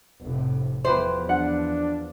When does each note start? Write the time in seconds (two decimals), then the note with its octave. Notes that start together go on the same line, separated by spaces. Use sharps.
0.23 F1 A2 C3
0.85 E2 F3 E4 G4 B4 C5
1.29 D4 F#5